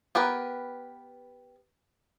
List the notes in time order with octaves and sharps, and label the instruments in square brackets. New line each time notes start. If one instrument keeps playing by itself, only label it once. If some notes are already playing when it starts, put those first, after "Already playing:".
[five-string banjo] B3 G4 A#4 B4